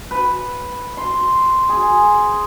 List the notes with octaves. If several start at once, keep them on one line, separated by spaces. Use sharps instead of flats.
B4
C6
G#4